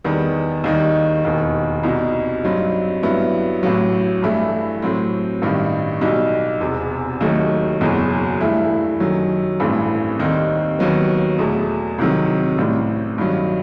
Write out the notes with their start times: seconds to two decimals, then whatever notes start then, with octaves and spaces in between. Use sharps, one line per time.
0.04 E2 D#3 G3 B3
0.64 D#2 D#3 G3 D#4
1.25 E1 D#2 D#3
1.83 C2 B2 G3 D#4
2.43 G2 F#3 C4 D#4
3.03 G2 F#3 B3 E4
3.63 A1 A2 F#3
4.23 G2 E3 A3 E4
4.82 A2 F#3 C4
5.42 A1 G2 D#3
6.01 B1 B2 G3 D#4
6.61 E1 E2 C3
7.21 D#2 D#3 F#3 A3 D#4
7.81 F#1 E2 B2 F#3
8.41 G2 E3 A3 E4
9.00 F#2 D#3 F#3
9.60 A1 G2 E3 A3 C4
10.19 D#2 D#3 G3 C4 D#4
10.79 D#2 D#3 F#3 B3
11.38 E2 B2 A3
11.98 C2 C3 D#3 F#3
12.58 A1 A2 G3 C4
13.18 G2 D#3 F#3